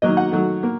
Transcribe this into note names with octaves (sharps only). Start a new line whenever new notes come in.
D#3 F#3 A#3 D#5
F#5
D#3 F#3 A3
A#3